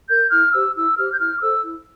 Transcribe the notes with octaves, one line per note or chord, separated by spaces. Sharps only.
A#4 G6
E4 F6
G4 C5 E6
E4 E6
G4 C5 F6
G6
E4 F6
D6
A4 C5 E6
E4